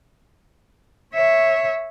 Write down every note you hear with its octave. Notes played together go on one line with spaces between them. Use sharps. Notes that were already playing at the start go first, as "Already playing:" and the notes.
C#5 E5